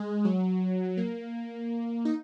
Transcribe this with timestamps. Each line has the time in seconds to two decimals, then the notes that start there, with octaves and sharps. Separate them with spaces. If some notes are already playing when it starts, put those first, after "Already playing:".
Already playing: G#3
0.25 F#3
0.97 A#3
2.05 D#4